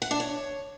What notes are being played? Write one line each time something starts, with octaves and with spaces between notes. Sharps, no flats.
F#5
D4
C#5